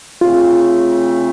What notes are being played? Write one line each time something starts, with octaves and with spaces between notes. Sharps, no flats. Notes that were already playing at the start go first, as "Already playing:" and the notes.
C#3 A3 C4 F4